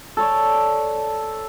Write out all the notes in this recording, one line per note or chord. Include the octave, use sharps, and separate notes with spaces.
A4 C#5 D5